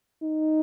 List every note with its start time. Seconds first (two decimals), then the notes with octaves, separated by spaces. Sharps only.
0.23 D#4